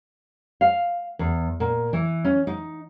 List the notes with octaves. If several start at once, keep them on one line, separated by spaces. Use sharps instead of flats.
F5
E2
A#2
E3
C#4
D#4